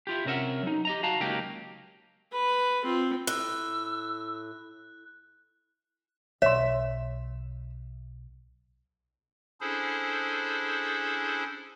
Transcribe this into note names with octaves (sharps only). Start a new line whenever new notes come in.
E4 F4 G4
C3 C#4 A#4 E5 F#5
F#3 D#4
G4 D#5 A#5
F#4 F5 A5 A#5
C#2 F#3 A#3 D#4 G4 G5
B4
C4 F4
A2 E6 F#6
B1 C#5 E5 C6
C#4 D4 E4 G#4 A4 C5